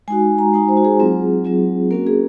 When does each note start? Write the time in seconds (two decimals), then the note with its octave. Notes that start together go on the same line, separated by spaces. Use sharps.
0.08 G#3 D#4 F#4 G#5
0.38 A#5
0.53 G#3 D#4 F#4 G#5
0.68 C5
0.77 F#4
0.85 G#4
1.00 F#3 C4 F4
1.45 F#3 C4 F4
1.91 A#3 C#4 F#4 A#4
2.07 G#4